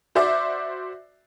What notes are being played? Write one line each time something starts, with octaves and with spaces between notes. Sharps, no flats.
F#4 C5 D5 E5 D6